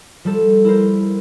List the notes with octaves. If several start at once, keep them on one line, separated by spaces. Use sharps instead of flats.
F3 G3 A4
E4 A#4 C5